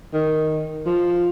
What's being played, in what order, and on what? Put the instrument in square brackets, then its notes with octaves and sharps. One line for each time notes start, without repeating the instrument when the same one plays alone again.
[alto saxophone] D#3
F3